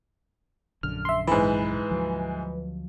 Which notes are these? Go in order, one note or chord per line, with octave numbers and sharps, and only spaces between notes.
A#1 F#2 D3 F6
E5 C6
G#2 E3 B4
D2 F3 F#3